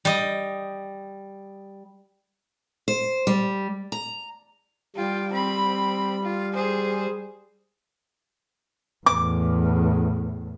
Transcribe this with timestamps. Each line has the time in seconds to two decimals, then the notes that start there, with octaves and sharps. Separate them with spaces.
0.05 G3 D#5
2.88 C5
3.27 G3
3.92 A#5
4.96 G3 F4 G5
5.33 C4 B5
6.23 F4
6.54 G#4 C5
9.06 E2 A2 D6